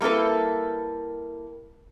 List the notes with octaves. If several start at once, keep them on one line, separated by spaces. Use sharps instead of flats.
G3 A#3 E4 A4 B4